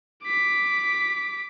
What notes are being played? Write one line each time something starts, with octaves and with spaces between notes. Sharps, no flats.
D6 B6